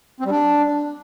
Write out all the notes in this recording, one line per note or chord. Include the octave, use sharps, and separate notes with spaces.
C4
G3
D4